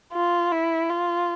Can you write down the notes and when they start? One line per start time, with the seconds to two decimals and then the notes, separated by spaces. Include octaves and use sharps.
0.13 F4
0.52 E4
0.90 F4